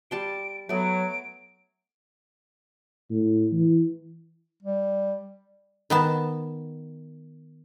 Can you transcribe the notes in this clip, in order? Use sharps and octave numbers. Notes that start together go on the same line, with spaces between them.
G3 A5 C6 D7
F#3 A3 B3 D7
A2
E3
G3
D#3 B3 A5